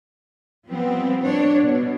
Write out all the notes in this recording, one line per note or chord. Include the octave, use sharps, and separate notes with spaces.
F3 G3 B3 C4
D4 C#5
B2